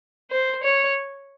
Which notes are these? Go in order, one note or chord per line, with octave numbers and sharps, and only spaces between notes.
C5
C#5